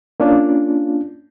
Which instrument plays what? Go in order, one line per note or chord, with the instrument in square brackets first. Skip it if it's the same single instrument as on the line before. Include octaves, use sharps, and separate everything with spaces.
[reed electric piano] A#3 C#4 D4 F4